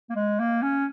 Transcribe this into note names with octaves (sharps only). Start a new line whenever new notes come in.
A#3
G#3
A#3
C#4